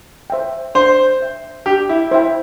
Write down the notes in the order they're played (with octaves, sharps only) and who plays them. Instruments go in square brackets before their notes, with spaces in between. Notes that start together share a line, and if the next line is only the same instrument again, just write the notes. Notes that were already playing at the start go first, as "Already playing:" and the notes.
[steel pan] C5 E5 G5
[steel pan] D4 [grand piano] C5
[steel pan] C5 E5 G5
[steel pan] D4 [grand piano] G4
[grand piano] E4
[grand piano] E4 [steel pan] C5 E5 G5